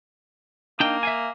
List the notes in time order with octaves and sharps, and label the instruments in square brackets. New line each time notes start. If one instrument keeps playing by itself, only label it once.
[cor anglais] A#3 [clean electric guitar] D4 D#4 G5
[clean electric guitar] E5 F5 G#5